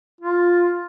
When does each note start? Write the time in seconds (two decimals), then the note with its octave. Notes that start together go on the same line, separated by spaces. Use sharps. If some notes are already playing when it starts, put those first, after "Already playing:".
0.21 F4